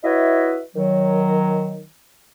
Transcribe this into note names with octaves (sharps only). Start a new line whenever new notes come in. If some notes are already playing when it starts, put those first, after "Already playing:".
E4 F#4 B4 C#5 D#5 E5
D#3 F#3